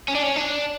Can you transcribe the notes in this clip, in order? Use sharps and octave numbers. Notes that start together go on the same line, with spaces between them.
C#4
D4
C#4
D4